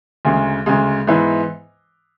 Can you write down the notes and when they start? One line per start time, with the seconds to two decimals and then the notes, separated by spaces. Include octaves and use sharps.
0.25 D2 C#3 G#3
0.66 D2 C#3 G#3
1.07 G#2 E3 B3 E4 B4